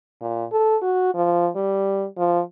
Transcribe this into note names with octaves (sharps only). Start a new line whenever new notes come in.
A#2
A4
F#4
F3
G3
F3